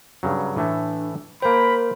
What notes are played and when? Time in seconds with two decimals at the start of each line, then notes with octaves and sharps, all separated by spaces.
0.23 G2 C#3 F#3
0.56 A2 E3 A3 D4
1.42 A#3 A#4 C5 G5 B5